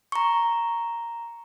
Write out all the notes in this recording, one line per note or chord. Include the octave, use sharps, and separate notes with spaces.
A#5 C#6